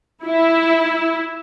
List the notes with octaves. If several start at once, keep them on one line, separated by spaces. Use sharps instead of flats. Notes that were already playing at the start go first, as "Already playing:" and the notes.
E4